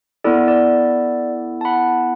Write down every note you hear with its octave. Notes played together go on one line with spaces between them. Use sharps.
B3 E4 A4 D5
D5
A5
F#5 B5